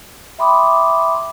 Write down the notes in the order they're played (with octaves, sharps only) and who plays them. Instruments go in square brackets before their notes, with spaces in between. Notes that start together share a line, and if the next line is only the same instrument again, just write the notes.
[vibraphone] E5 G5 B5 C6 D6 D#6